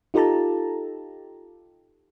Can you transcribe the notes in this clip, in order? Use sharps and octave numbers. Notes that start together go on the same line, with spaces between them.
D#4 F4 G4 A4 A5 A#5